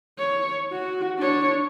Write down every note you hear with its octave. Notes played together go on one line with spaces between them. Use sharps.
C#5
F#4
D4 C#5